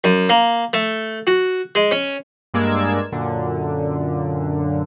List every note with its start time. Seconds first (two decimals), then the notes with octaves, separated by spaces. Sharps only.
0.04 F#2
0.29 A#3
0.73 A3
1.27 F#4
1.75 G#3
1.91 C#4
2.54 G2 G#3 A#3 D5 E6 G#6
3.12 F#2 A#2 D3